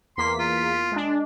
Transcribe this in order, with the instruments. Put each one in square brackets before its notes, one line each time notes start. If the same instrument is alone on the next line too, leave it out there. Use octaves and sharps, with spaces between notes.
[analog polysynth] E2 A#3 B6 [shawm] C6
[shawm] F4
[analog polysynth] G#3 D4